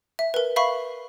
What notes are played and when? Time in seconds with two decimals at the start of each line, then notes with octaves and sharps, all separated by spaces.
0.19 E5
0.34 A#4 B4
0.56 E5 F5 B5 C#6